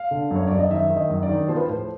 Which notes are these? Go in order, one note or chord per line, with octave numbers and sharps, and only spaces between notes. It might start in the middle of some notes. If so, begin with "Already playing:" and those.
Already playing: F5
D3
F#2
C#5
F#2 D5
D#5
D#3 E5
D#3
D#5
F#2
D5
D#3
F3 C5
B4
A2 C5